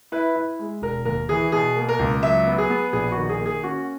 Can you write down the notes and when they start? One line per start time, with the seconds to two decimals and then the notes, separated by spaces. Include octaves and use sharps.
0.12 E4 B4
0.36 E4
0.59 G#3
0.82 E1 A#4
1.05 D#2 A#4
1.29 E3 G#4
1.52 B2 G#4
1.76 A#3
1.89 A#4
1.99 C#2
2.23 F#3 E5
2.47 B3
2.58 G#4
2.70 B3
2.93 A#1 G#4
3.11 D#3 F#4
3.29 G#4
3.40 A#3
3.46 G#4
3.63 C#4 F#4